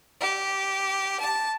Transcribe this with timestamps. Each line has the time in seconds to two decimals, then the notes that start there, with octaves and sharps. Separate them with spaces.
0.20 G4
1.18 A5